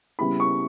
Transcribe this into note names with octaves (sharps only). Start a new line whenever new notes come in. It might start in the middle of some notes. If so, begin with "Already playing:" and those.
C#3 G3 B3 E4 B5
C#6